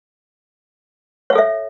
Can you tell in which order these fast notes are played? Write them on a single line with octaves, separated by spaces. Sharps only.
C#5 F5 A4 E5